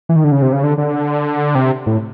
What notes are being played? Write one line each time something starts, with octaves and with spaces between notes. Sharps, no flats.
E3
D#3
D3
C#3
C3
C#3
D3
D3
C3
A2